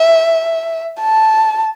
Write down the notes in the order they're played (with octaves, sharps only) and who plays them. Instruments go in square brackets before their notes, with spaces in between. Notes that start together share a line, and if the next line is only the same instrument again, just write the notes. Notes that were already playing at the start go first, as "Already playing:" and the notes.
Already playing: [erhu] E5
A5